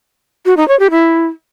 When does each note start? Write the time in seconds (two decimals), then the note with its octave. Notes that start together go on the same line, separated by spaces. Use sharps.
0.46 F#4
0.57 D#4
0.68 C#5
0.79 G4
0.91 E4